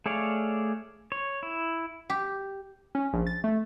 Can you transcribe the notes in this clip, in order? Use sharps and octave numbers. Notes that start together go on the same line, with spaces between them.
A3 G#4 C#5 D5 F5
C#5
E4
G4
C#4
A#1
A6
A3